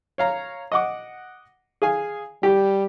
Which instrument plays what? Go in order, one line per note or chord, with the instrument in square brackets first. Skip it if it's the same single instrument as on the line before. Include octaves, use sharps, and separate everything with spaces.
[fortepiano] C#5 F5 A#5
D#5 F#5 D6
G#4 F5 G#5
[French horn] G3 [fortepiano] G4